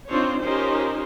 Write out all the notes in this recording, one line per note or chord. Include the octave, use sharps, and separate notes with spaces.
C4 D4 D#4 F4 C5 C#5
C#4 D#4 F4 G4 A#4 C5